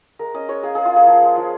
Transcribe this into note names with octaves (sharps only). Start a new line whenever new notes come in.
G#3 A#4
C#4 D#5
G#3 C#5
A#3 G#4
C#4 G#4
F4
A#3 G#4
F3
G#3
F3